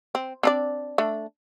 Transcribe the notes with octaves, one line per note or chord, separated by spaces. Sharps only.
C4
C4 D4 D5
A3 D4